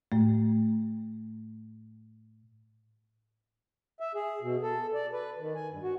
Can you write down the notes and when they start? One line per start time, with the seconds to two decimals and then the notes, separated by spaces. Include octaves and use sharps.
0.12 A2 A3
4.00 E5
4.15 G#4
4.42 B2
4.62 A4
4.94 D5
5.13 B4
5.39 D#3
5.55 G#5
5.71 G2
5.83 F#4